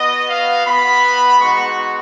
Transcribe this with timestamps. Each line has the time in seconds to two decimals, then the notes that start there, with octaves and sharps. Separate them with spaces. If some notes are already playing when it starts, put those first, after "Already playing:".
Already playing: B3 F#4 D#5
0.30 F5
0.66 B3 F#4 B5
1.39 G#3 B3 D#4 F#4 C#6